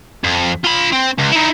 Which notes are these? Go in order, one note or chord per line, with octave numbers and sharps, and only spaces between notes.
F2
F4 B5
C4
C#2
D#4 E4